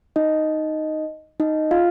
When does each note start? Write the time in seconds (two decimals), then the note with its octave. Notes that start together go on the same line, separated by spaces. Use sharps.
0.16 D#4 D#5
1.40 D#4 D#5
1.71 F4 F5